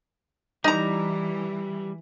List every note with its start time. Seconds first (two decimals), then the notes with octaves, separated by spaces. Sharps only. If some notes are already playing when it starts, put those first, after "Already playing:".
0.64 E3 G3 D#4 A#5